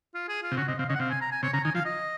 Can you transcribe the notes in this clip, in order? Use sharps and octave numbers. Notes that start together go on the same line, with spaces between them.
F4
G#4
F4
C3
C#3 F#4
C3 D#5
C3 F5
C#3 D#5
F#5
C3 F5
G#5
A#5
G#5
C3 C#5
C#3 A#5
D#3 G#5
F3 F5
D#5